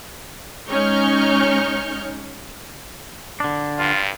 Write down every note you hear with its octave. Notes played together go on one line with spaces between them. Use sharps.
G#3 C#4 D#4 C#6 F6 G6
D3 D4
G2 F4